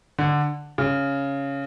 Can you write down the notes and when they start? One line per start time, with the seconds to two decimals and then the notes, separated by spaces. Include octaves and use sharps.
0.19 D3
0.78 C#3